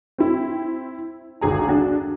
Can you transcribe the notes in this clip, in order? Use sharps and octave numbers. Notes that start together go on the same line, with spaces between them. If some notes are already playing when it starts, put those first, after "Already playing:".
C4 E4
G#1 D2 G#4 A#5
D4 F#4